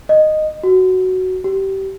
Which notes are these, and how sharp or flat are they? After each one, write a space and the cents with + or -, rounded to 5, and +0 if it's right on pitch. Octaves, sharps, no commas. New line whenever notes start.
D#5 -10
F#4 +5
G4 -25